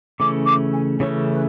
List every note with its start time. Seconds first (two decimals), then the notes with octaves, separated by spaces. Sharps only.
0.19 C#3 E3 A3 C#4 D6
0.46 D6
0.73 G#5
0.99 C#3 E3 A3 C#4 C#5
1.32 B4